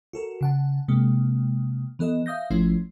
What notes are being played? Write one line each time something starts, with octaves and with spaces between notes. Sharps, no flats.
F#4 A4 A#4
C#3 F#5 A5
C3 G#3 A#3
E3 B3 A4 D#5
E5 F5 D#6 G6 A#6
G#1 F3 A3 C#4 E4 C7